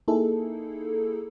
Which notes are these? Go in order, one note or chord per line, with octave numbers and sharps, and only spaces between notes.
A#3 D#4 E4 G#4 A4